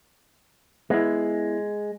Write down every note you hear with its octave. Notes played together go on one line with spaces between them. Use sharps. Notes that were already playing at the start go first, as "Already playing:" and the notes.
G#3 B3 E4